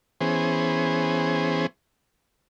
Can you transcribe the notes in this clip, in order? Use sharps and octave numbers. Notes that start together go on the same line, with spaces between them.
E3 B3 C#4 G#4 C5